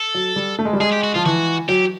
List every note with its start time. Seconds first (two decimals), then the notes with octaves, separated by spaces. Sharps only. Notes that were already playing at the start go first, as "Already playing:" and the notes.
Already playing: A4
0.14 F#3
0.36 G3
0.59 A3
0.65 G#3
0.73 G3
0.80 G#3 G#4
0.92 G4
1.03 F#4
1.14 F3 F4
1.25 E3 F#4
1.69 F#3 G4